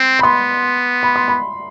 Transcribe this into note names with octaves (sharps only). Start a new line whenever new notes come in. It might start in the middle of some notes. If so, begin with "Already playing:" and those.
Already playing: C4 C6
B5
B3 C6
B5
C6
B5